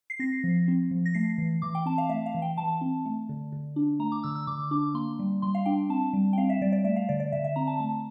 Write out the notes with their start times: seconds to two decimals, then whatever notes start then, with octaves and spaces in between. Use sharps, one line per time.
0.10 C7
0.19 C4 A#6
0.44 F3
0.68 C4
0.91 F3
1.06 A#6
1.14 A3 C7
1.38 E3
1.62 E3 D6
1.75 G5
1.86 C4 A5
1.98 F5
2.09 A3 E5
2.26 F5
2.34 E3
2.42 G5
2.57 E3 A5
2.81 C4
3.06 A3
3.29 D3
3.52 D3
3.76 D4
3.99 A3 A#5
4.12 D6
4.24 D3 E6
4.35 E6
4.47 D3 D6
4.71 D4 D6
4.95 A#3 C6
5.19 G3
5.42 G3 C6
5.55 F5
5.66 D4 G5
5.89 C4 A5
6.13 G3
6.33 G5
6.38 C4 F5
6.50 E5
6.61 G3 D5
6.72 D5
6.84 A3 E5
6.96 F5
7.09 D3 D5
7.20 D5
7.32 D3 E5
7.44 E5
7.56 C4 A#5
7.67 A5
7.80 A3 A5